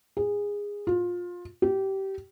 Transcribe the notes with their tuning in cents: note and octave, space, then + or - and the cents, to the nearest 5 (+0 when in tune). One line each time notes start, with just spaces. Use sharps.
G#4 -20
F4 +20
G4 -20